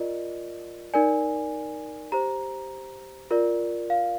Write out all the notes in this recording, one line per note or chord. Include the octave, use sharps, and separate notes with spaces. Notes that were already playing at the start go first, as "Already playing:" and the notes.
Already playing: F4 A#4 D5 D#5
D#4 A#4 D5 G#5
G4 C5 A#5
F4 A#4 D5
F5